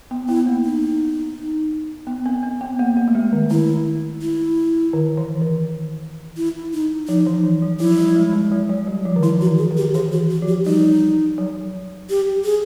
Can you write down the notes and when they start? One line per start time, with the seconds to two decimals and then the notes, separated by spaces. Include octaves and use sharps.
0.11 B3
0.28 B3 E4
0.46 A#3
0.64 D#4
2.07 B3
2.26 C4
2.43 C4
2.61 B3
2.79 A#3
2.97 A#3
3.08 A3
3.15 G#3
3.32 D#3
3.50 D#3 E4
4.21 E4
4.93 D#3
5.17 E3
5.42 D#3
6.37 E4
6.73 D#4
7.08 F3 D#4
7.26 E3
7.62 F#3
7.80 F3 E4
7.98 G3
8.16 G#3
8.33 G#3
8.51 F#3
8.69 F#3
8.87 G3
9.05 F3
9.16 D#3
9.23 E3 E4
9.41 F#4
9.47 D#3
9.58 G#4
9.71 D#3
9.77 G4
9.94 E3 G#4
10.12 F#4
10.30 F#4
10.42 F3
10.48 G4
10.65 G3 D#4
11.38 F#3
12.10 G4
12.44 G#4